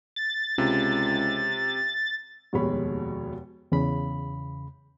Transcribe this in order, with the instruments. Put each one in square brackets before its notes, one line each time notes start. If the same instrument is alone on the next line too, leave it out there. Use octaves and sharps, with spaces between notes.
[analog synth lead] A6
[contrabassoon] C#2 [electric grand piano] C3
[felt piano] F1 D#2 B2 G#3 C#5 B5
[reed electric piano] E2 C#3 B5